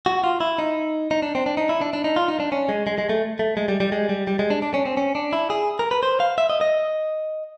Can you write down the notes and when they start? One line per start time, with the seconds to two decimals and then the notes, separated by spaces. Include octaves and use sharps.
0.06 F#4
0.24 F4
0.40 E4
0.58 D#4
1.11 D#4
1.22 D4
1.35 C4
1.46 D4
1.57 D#4
1.69 E4
1.81 D4
1.93 D4
2.04 D#4
2.16 F4
2.28 D#4
2.40 D4
2.52 C#4
2.69 G#3
2.87 G#3
2.98 G#3
3.09 A3
3.39 A3
3.57 G#3
3.68 G3
3.80 G3
3.92 G#3
4.09 G3
4.27 G3
4.39 G#3
4.50 D4
4.62 D4
4.74 C#4
4.86 C4
4.97 C#4
5.15 D4
5.33 E4
5.50 G#4
5.79 A#4
5.91 B4
6.03 C5
6.20 F5
6.38 E5
6.50 D#5
6.61 D#5